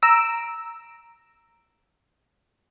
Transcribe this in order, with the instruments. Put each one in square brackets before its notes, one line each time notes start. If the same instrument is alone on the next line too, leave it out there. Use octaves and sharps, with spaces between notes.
[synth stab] A#5 E6 D7